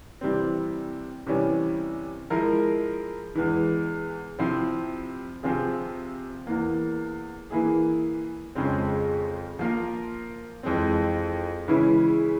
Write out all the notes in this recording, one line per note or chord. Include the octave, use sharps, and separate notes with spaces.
C3 E3 G3 C4
C3 E3 G3 C#4
F3 G#3 E4 A#4
E2 E3 G#3
C3 F3 C4 E4
C3 F3 C4 F4 G#4
E2 E3 A#3
E3 A#3 E4 G#4
F2 C#3 F3 G#3 C4
F3 A#3 F4 A#4
F2 E3 G#3 C4
C#3 E3 G#3 E4